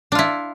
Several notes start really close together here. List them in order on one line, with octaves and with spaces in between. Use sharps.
D4 F4 E4